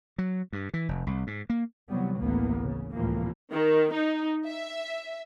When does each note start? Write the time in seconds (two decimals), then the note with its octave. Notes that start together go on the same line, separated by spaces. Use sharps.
0.18 F#3
0.53 G2
0.74 E3
0.88 F1
1.07 C2
1.27 G#2
1.50 A#3
1.89 C3 E3 F#3 G3 B3
2.21 A1 D2 E3 A#3 B3
2.63 C#3
2.94 C#2 A2 C3 E3 F3 A#3
3.51 D#3
3.92 D#4
4.47 E5